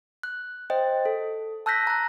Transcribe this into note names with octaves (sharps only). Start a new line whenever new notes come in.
F#6
C5 D#5 G5
A4
A5 E6 F#6 G6 A#6 B6
A#5 F#6